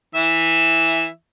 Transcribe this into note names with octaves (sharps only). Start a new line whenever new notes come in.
E3 E5